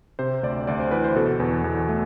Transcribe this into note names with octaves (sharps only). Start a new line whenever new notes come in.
C3 C5
D2 D5
D2 D5
C5
E3 B4
C5
B2 A4
E2
E2
A3